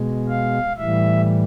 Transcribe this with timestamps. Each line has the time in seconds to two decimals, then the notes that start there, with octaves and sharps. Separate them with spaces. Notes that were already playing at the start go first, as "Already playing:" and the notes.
Already playing: B2 G#3
0.28 F5
0.78 A2 E3 G3 E5